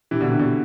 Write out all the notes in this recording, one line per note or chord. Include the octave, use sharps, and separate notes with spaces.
C3 E3
B2 D3
C3
B2 D3